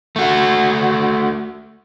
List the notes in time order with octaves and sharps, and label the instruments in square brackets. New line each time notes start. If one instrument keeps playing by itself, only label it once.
[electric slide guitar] A3 F#4